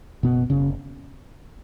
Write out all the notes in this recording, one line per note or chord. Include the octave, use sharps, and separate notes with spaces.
F#1 B2 B3
F#1 C#3 C#4